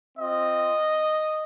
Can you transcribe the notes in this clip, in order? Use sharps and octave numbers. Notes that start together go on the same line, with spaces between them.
C4 F4 D#5